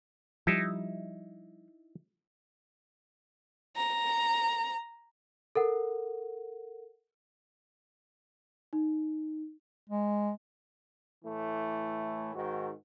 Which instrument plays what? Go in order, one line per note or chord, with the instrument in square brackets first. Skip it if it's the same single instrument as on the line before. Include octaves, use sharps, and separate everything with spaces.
[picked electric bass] F3 G3 [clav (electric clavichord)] D#4 E4
[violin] A#5
[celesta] A4 A#4 F#5
D#4
[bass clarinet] G#3
[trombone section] A2 E3 A3
G#2 D#3 F#4